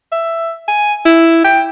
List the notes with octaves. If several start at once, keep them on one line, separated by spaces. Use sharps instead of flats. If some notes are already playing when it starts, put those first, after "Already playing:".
E5
G#5
E4
G5